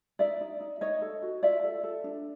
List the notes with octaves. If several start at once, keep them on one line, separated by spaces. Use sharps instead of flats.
D#4 D5 E5
D#4
D#4
D#4 C#5 D#5
A4
F#4
F4 D5 E5
A4
A4
D4